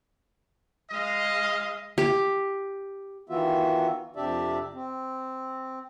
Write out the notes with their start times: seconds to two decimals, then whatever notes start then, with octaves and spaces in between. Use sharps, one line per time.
0.91 G#3 D#5 F5
1.98 G4
3.29 D#3 E3 B3 F4 F#4 E5
4.16 F2 C3 D4 G4 D5 E5
4.74 C4